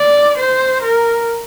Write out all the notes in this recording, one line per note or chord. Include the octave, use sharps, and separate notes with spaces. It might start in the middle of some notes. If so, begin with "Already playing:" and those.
Already playing: D5
C5
A#4